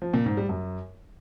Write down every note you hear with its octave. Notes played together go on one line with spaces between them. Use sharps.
F3
A#2
G#2
G3
F#2